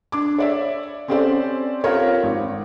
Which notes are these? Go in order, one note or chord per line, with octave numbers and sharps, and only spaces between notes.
D4 D6
C#5 D5 E5
C4 C#4 G4 A4 C5 D5
C4 F4 G4 A#4 C#5
G#1